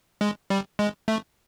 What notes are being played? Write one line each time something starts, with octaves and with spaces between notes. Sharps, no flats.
G#3
G3
G#3
A3